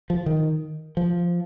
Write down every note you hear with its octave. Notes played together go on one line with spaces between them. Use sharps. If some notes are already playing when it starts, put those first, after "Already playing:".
F3
D#3
F3